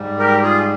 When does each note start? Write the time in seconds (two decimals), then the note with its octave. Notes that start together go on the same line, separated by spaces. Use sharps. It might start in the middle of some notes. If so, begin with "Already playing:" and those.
Already playing: G#2 G3
0.19 G4 A#4
0.42 F4 G#4